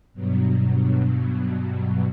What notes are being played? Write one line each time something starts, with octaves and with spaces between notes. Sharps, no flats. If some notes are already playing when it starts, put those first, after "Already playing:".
G2 B2 F#3